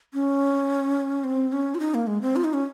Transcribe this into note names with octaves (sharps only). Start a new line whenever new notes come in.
C#4
C4
C#4
F4
D#4
A#3
G#3
C4
F4
D#4
C#4